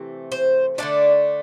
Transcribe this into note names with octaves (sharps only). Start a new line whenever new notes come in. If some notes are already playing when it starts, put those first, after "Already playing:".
Already playing: C3 E3 A3 C4
C5
D3 A3 D4 D5